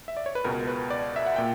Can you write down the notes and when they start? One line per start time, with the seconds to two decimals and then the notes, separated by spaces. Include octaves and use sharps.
0.08 E5
0.17 D5
0.26 C#5
0.35 B4
0.44 C#2 B2 A#4
0.67 B4
0.90 D5
1.16 E5
1.26 F#5
1.36 A#2 G5